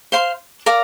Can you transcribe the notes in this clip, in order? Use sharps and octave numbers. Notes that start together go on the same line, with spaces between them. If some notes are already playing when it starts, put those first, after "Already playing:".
C5 F5 C6
A#4 D5 F5 A#5